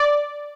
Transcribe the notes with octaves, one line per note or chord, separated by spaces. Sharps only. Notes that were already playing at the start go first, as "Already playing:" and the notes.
Already playing: D5